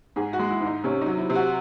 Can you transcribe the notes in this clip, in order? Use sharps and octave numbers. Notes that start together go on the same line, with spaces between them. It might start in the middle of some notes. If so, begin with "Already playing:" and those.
G#2 G#4
F#4
G#3
E4
G#2
D#4
C3 C#4
F#3 D#4
E4
C3
F#4